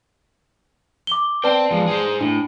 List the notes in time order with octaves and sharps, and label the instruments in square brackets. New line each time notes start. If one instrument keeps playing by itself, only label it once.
[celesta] D6 G7
[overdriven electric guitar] C4 G5 [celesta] B4 D5 A5
[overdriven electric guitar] F3 G#3
G#4 C5
[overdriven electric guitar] A2 [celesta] D4